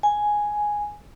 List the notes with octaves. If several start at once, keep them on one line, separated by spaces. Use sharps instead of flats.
G#5